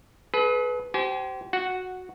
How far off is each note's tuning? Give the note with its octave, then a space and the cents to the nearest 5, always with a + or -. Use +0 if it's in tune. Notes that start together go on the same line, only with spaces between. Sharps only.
G#4 +45 B4 +0
G4 -40 C5 -10 G#5 +20
F#4 -10 F#5 +0